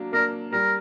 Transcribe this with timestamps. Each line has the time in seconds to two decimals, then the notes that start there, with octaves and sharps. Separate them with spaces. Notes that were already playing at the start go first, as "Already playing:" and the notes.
Already playing: F#3 A#3 D4
0.13 A#3 D4 A#4
0.52 G3 A#4